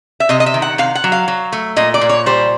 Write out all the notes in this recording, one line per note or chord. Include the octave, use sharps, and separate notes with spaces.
E5
C3 D#5
D#5
E5
D#3
F#5
C3 F5
F#5
F#3
F5
F#3
A3
A#2 D#5
D5
A#2
C#5
G3 C5